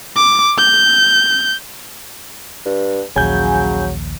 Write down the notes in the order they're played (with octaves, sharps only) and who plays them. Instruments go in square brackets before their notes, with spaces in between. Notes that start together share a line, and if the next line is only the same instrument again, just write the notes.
[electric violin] D6
G6
[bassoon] G2
[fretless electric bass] A#1 D#2 [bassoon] C#3 [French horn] F#3 [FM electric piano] G#5 G6